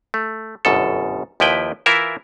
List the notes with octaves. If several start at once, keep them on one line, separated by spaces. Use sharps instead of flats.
A3
G1 F#2 B2 A4
D#2 F3 E4 B4 G5
E3 E4 F4 A#4 E5